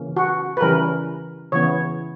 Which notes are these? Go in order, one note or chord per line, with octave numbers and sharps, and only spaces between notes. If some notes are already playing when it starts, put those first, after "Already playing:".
Already playing: C#3 E3 A#3 C#4
F#4
B4
C#3 E3 G3 C#4 A#4
C#3 E3 B3 C#5